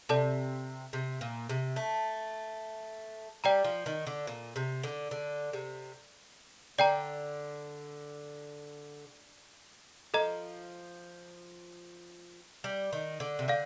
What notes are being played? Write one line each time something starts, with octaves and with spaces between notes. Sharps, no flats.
C3 A4 D5 A5
C3
A#2
C3
A3
G3 D5 G5 A#5
F3
D#3
D3
A#2
C3
D3
D3
C3
D3 D5 G5 A#5
F3 A4 D#5 A#5
G3
D#3
D3
C3
D3 D5 F5